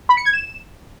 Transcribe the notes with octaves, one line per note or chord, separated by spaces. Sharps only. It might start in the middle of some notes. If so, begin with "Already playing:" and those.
B5
C#7
G#6
E7